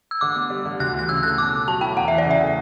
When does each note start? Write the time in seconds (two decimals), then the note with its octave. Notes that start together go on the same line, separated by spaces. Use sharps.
0.11 E6
0.21 D3 D6
0.36 B3
0.50 G3
0.66 D3
0.80 D2 F#6
0.94 E3 F#6
1.09 C#3 E6
1.23 A3 F#6
1.38 B2 D6
1.53 A3
1.67 F#3 A5
1.81 E4 G5
1.96 E2 F#5
2.08 E3 E5
2.18 D5
2.25 C#3
2.31 E5
2.40 A3